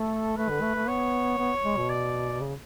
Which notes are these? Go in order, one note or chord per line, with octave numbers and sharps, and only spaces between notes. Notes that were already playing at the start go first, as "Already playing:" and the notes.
Already playing: A3 A4
A3 B4
D3
A3
A3
B3 C#5
B3
G#3
B2
D5
C#3